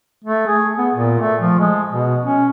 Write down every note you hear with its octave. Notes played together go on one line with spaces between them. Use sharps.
A3
G#4
B3
A#2
A3
F3
G#3
B2
C#4